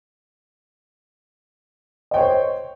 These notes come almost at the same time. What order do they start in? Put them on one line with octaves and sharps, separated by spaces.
D#5 G5 C#5 C5